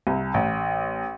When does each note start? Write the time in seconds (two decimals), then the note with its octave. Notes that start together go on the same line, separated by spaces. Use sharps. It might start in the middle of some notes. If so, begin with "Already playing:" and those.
0.07 C2
0.34 A1